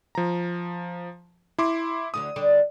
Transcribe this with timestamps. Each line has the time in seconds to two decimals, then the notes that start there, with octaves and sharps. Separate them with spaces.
0.15 F3 A#5
1.59 E4 C6 D6
2.14 D2 D3 F#3 D#6
2.36 D3 G3 D4